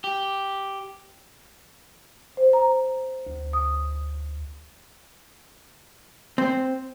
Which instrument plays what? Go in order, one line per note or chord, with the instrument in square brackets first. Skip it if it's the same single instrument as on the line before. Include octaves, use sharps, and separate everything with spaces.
[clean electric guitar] G4
[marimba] C5
A#5
D2
D#6
[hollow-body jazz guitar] C4